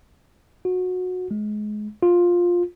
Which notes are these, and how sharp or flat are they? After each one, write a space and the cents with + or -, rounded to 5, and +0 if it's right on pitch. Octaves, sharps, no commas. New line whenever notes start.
F#4 -20
G#3 +25
F4 +10